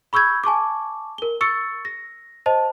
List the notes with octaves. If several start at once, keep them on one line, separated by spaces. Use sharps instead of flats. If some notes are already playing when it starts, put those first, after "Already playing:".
B5 C#6 E6 G6 G#6
G#5 A5 C#6 D6
A#4 G7
C#6 E6 A6 C#7
A#6
C5 D#5 A5